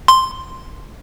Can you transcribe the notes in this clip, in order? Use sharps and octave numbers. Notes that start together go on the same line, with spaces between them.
C6